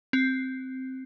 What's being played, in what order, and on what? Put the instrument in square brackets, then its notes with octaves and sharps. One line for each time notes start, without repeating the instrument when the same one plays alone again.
[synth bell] C4